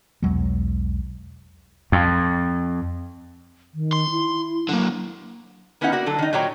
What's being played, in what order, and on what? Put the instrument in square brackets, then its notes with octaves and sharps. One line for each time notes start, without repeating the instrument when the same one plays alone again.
[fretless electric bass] B1 E2 F#3 G#3
[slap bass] F2
[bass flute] D#3
[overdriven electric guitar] C6
[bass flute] E4
[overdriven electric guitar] D3 A#3 [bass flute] F#3
[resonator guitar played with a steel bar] D#3 B3 C#4 D#4 E4 F#5
A#3 F#4 D5
D3 F#3 A4
D#3 D#4
A#2 F#3 C#5 D5 G5 A#5